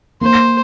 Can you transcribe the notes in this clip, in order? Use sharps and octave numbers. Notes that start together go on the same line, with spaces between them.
A#3 C5